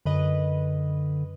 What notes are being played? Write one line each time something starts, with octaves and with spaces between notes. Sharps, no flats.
F#2 D3 B4 D#5